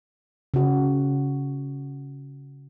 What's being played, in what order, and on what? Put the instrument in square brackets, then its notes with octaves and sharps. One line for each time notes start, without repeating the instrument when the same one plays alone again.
[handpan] C#3 F#4